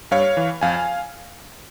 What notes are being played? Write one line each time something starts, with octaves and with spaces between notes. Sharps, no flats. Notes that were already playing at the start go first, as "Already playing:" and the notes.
G2 C#5 F5
E3
F2 F5 G#5